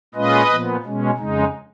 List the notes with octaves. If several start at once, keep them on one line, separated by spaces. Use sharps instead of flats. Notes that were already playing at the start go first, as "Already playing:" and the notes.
A#2 G#3 C#4 F4 B4 D#5
A#2 F3 B3
B2 G#3 C#4
F2 C#3 G#3 D#4